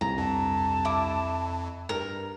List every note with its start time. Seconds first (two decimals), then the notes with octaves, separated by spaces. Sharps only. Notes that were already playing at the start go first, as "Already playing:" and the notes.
0.01 C2 G2 A#5
0.18 F2 A5
0.85 E4 D6
1.89 G2 A#4